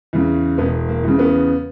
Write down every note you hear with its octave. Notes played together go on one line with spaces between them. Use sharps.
E2 C#3
E1 B3
A#3
E2 C#3
B3